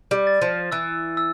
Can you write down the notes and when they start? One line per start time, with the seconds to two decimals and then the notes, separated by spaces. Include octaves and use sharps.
0.11 G3
0.27 A6
0.42 F3
0.72 E3 E6
1.17 E6